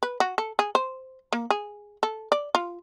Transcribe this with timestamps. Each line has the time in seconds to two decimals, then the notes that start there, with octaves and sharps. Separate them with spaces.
0.03 B4
0.20 F#4
0.38 A4
0.59 G#4
0.75 C5
1.33 A#3
1.50 G#4
2.03 A4
2.32 D5
2.55 F4